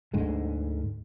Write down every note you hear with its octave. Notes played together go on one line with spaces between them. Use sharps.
D2 G#2 D3 G#3